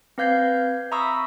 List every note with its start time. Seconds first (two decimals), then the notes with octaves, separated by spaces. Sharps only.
0.18 C4 B4 F5 G6 G#6 C7
0.91 E5 A#5 B5 C#6 D#6 E6